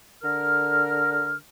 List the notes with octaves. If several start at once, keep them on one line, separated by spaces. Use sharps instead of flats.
D3 A#4 F6